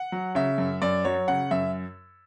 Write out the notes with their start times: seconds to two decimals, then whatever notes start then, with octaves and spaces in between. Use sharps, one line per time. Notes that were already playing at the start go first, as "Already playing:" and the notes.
Already playing: F#5
0.12 F#3
0.35 C#3 E5
0.58 F#2
0.82 F#2 D5
1.05 F#3 C#5
1.28 C#3 F#5
1.51 F#2 E5